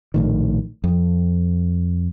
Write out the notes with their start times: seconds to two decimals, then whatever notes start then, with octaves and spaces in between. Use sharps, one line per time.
0.14 A#1 A2 D#3
0.84 F2